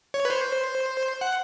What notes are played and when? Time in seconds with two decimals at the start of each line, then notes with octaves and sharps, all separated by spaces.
0.14 C#5
0.25 B4
0.30 C5
1.21 F#5